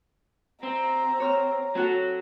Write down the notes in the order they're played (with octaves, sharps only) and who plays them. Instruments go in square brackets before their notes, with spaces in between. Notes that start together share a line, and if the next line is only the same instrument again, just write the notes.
[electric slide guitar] C4 [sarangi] A#5
[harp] C#5 F6
[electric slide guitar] F#3 [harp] C4 F#4 A4